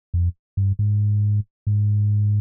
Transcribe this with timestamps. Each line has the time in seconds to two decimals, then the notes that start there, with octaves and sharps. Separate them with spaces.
0.14 F2
0.57 G2
0.79 G#2
1.67 G#2